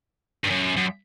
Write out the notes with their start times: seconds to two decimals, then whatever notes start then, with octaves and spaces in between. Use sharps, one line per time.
0.44 G2
0.50 F#2
0.77 F#2